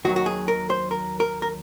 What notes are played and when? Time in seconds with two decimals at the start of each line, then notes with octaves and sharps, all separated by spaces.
0.05 D#2 D#3 F#3 F#4
0.16 F#4
0.26 G#4
0.48 A#4
0.70 C5
0.91 A#4
1.20 A#4
1.42 A#4